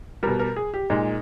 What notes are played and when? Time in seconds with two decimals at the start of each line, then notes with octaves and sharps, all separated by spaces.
0.23 B2 G3 A#4
0.40 A#4
0.56 G#4
0.74 G4
0.90 A#2 G#3 D#4